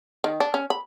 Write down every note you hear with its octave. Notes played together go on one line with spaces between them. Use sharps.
D#3
D4
C#4
B5